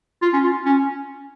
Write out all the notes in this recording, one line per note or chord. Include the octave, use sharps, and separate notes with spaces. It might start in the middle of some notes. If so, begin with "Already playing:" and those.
F4
C#4
F4
C#4